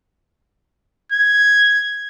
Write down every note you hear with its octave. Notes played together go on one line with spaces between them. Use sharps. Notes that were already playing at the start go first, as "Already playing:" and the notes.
G#6